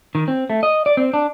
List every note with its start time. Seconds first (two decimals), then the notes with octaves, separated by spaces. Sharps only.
0.15 D#3
0.28 C4
0.50 A3
0.63 D#5
0.86 D5
0.97 C4
1.13 D4